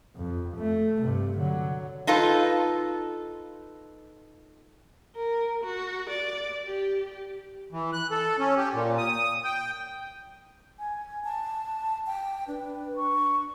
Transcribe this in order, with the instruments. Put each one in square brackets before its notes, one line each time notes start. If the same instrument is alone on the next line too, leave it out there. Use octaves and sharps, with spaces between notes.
[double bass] F2
A3
G2 C3
D3 F#3
[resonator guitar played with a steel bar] D#4 F4 A4 B4
[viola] A#4
F#4
D5
G4
[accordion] E3
F#6
A4
C#4
G4
A#2
D#6
G5
[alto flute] G#5
A5
G5
[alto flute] D4 [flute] B4
[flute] C#6